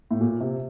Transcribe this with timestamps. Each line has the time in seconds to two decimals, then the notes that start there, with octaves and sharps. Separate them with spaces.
0.11 A2
0.21 A#2
0.41 C3